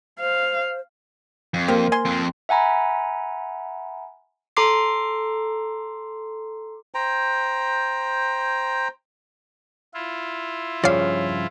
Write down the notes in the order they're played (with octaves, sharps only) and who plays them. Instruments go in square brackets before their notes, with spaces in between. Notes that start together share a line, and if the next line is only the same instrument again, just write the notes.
[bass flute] C5 [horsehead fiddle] F5
[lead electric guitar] F2
[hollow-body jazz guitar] A#3 A#4 C5 [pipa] G4
[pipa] G#5 C6
[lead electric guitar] F2 C4
[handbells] E5 F#5 G#5 A#5 B5
A4 A#5 C6 D6 C7
[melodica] C5 G5 A#5
[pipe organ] E4 F4
[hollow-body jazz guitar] G2 C#3 F3 [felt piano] C#5 [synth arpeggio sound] D5 F5